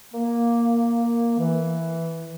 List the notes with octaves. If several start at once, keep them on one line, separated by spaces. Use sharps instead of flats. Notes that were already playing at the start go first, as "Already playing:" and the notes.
A#3
E3